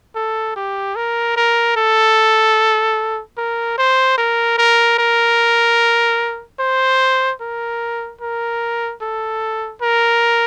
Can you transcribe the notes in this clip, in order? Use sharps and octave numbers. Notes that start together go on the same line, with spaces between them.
A4
G4
A#4
A#4
A4
A#4
C5
A#4
A#4
A#4
C5
A#4
A#4
A4
A#4